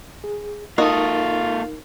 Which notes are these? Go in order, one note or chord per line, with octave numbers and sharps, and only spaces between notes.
G#4
A#3 D#4 F4 F#4 A4 A#4 D#5